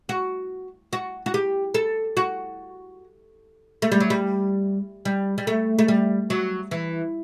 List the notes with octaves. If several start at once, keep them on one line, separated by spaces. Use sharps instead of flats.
F#4
F#4
F#4
G4
A4
F#4
A3
G3
F#3
G3
G3
G3
A3
A3
G3
F#3
E3